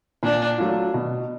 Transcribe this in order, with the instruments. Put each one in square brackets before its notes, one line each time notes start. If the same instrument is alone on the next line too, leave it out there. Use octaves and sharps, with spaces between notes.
[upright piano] A#2 [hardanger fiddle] D4
[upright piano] F#3 A3 D4 F4
B2